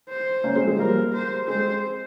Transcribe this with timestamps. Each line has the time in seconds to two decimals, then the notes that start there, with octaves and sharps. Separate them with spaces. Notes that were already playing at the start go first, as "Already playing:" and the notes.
0.09 C5
0.44 A#3 C#4
0.56 G#3 C4
0.67 F3 G#3
0.79 G3 A#3 A#4
1.13 C5
1.48 G#3 C4 C5